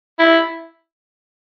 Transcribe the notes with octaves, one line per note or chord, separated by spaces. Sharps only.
E4